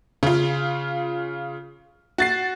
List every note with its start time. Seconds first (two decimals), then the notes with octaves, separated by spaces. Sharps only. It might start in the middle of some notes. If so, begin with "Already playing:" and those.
0.23 C#3 F4
2.18 F#4 A6 C7